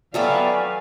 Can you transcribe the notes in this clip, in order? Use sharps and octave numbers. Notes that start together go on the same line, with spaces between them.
F#3 A3 B3 D5 E5 F5 G5 G#5